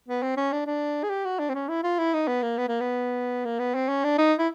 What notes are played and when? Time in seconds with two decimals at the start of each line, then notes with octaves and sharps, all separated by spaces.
0.08 B3
0.22 C4
0.37 C#4
0.52 D4
0.66 D4
1.04 G#4
1.10 G4
1.25 F#4
1.39 D4
1.49 C4
1.54 C#4
1.69 E4
1.83 F4
1.99 E4
2.14 D#4
2.28 B3
2.43 A#3
2.58 B3
2.68 A#3
2.80 B3
3.45 A#3
3.59 B3
3.75 C4
3.89 C#4
4.04 D4
4.18 D#4
4.39 E4